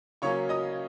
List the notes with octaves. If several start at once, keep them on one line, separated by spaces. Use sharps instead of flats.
C#3 F#3 A#3 C#4 C#5 C#6
D#5 D#6